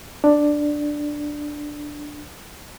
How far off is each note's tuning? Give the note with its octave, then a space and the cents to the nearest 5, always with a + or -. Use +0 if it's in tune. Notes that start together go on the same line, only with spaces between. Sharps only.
D4 +5